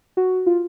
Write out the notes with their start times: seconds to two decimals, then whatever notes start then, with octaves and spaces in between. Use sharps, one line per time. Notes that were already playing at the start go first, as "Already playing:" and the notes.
0.17 F#4
0.46 F4